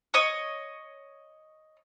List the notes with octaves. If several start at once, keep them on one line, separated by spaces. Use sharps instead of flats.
C#5 D#5 D#6